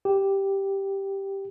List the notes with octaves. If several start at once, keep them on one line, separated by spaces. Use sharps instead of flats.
G4